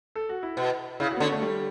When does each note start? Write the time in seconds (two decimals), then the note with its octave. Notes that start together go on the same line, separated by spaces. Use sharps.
0.16 A4
0.29 F#4
0.43 E4
0.57 B2
1.00 C#3 E4
1.11 F#4
1.17 B3
1.20 D3 C#4
1.32 A3
1.42 G3